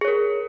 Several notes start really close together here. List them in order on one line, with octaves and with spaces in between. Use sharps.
G#4 C#5 A#4